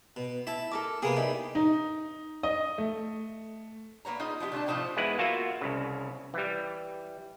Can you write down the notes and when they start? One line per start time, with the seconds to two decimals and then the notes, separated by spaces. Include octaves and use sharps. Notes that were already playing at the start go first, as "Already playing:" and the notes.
0.16 B2
0.47 E4 E5 A5
0.71 A4 A#4 D6
1.02 C3 A#3 B3 G#4
1.17 G3 D#4 E4
1.55 D#4
2.43 D#5
2.78 A3
4.05 A#3 B3 C#5 A#5
4.20 D#4 F4 G#4 D#5
4.40 F3 B3 E4 G4
4.52 D3 A3 D4 A5
4.66 A2 C3 F3 D#4 C5 G5
4.97 E2 G#3 E4 B4 F#5
5.19 A#3 F4 F#4 E5
5.61 C2 C#3
6.34 E3 G3